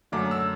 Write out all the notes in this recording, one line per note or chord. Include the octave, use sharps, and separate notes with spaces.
F#2 D3 F#3 A3 D6
E6